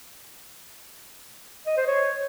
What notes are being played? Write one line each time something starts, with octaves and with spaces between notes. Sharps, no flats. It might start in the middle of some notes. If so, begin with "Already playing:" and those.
D#5
C5
C#5